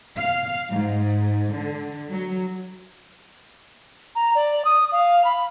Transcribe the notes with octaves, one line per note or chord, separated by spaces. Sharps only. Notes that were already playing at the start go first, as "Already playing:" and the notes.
F5
G#2
D3
F#3
A#5
D5
D#6
F5
B5